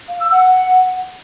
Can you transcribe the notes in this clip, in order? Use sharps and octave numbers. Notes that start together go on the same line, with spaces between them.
F5
E6
F#5